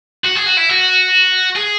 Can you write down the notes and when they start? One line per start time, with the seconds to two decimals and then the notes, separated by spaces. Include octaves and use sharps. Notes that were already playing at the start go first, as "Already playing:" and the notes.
0.25 F#4
0.37 G#4
0.47 F#4
0.58 E4
0.70 F#4
1.56 G#4